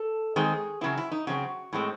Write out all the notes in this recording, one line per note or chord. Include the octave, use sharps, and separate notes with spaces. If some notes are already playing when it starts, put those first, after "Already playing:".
Already playing: A4
D#3 G#3 C4 G#4
C#3 F#3 C4 E4
E4
D#4
C#3 F#3 C4 F#4
A2 G#3 C4